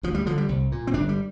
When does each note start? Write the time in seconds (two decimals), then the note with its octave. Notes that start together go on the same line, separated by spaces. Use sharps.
0.03 D2 F3
0.14 G3
0.26 D3 F3
0.38 G3
0.49 C2
0.72 A#2
0.87 C4
0.94 G1 D4
1.09 G3